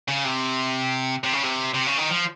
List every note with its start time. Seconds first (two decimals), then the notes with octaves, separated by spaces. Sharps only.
0.08 C#3
0.25 C3
1.24 C3
1.33 C#3
1.43 C3
1.74 C3
1.86 C#3
1.98 D#3
2.10 F3